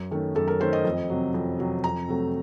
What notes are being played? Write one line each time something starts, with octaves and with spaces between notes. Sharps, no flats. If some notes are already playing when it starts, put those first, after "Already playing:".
Already playing: F#2
D#3 A3 C#4
F#2 A4
A#4
D#3 A3 C#4 C5
D#5
F2
C3 F#3
F2
C3 F#3
F2 A#5
C3 F#3 A3